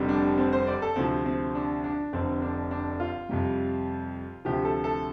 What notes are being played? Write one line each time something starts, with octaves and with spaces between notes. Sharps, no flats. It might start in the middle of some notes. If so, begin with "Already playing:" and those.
Already playing: F1 F2 D3 G3
D4
C4
C5
D5
A4
D2 C3 F3 C4
C4
D4
D4
F1 F2 D3 C4
D4
D4
F4
F2 C3 G3
D2 C3 F3 G4
A4
A4